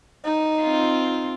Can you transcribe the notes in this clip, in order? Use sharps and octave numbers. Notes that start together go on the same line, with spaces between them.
D#4
C4 F4